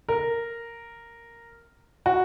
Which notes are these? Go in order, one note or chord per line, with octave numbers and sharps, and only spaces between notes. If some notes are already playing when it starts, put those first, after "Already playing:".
A#4
F#4